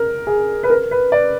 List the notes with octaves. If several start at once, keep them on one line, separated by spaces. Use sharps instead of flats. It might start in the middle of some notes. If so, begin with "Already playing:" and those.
Already playing: A#4
G#4
B4
A#4
B4
D5